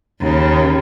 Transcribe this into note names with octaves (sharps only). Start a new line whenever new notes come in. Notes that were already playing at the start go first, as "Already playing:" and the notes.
D#2 C#3